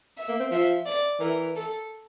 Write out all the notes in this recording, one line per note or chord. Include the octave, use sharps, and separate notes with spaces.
E5
A#3
C4
F3 E5
D5
E3 A#4
A4